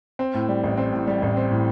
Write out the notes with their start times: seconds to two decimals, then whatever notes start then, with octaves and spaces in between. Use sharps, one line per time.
0.19 C4
0.34 A2
0.49 G3
0.63 A1
0.77 C4
0.93 A2
1.07 G3
1.22 A1
1.37 C4
1.51 A2